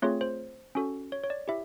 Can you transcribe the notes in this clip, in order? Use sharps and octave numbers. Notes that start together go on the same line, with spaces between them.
A3 C4 F4 G#4 C#5
C5
C#4 F#4 A4
C#5
C#5
D5
E4 G4 E5